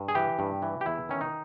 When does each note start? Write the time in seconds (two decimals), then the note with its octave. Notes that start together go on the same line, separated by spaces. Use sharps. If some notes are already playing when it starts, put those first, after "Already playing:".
Already playing: G2
0.08 G#4
0.15 E3 G4
0.39 G2
0.62 E3
0.81 G4
0.86 E2 E4
1.09 D#3 C#4
1.21 D#4